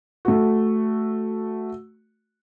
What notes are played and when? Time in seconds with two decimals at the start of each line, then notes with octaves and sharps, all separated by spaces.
0.25 A3 F#4